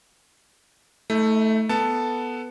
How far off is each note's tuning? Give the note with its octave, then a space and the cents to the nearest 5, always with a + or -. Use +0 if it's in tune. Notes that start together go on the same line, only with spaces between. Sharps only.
A3 +0 D#4 +45
B3 +0 A4 +0 A5 +0